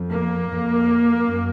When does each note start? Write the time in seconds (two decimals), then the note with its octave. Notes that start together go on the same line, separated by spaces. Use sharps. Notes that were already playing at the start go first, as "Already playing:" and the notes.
Already playing: F2
0.11 A#3
0.48 F2
1.20 F#2